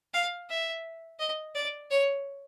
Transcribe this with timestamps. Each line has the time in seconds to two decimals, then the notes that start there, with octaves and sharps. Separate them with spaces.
0.14 F5
0.50 E5
1.19 D#5
1.55 D5
1.91 C#5